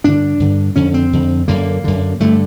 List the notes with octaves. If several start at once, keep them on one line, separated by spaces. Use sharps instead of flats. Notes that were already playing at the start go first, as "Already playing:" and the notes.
G2 D3 D4
G2 D3
F2 D3 C#4
C4
F2 D3
F#2 D3 A#3
F#2 D3
G2 D3 A3